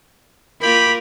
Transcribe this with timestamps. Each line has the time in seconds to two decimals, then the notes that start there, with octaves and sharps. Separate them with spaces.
0.61 A#3 F4 G4 A#4 B5